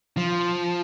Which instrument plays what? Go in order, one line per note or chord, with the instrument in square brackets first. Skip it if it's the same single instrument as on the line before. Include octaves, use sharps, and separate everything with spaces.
[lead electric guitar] F3